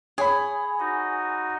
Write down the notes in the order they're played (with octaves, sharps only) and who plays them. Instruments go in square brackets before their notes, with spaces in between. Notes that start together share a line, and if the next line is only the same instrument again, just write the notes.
[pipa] G#4 [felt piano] C#5 B5
[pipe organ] D#4 F#4 D#5